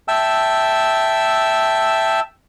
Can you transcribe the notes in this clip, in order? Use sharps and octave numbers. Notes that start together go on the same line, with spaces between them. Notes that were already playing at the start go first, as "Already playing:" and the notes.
E5 G5 A5 E6